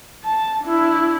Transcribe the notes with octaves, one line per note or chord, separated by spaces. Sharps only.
A5
D4 E4